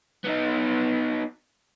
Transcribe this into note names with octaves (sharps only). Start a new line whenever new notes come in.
B3 D#4